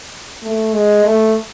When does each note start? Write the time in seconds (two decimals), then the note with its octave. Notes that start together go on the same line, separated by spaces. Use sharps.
0.43 A3
0.73 G#3
1.04 A3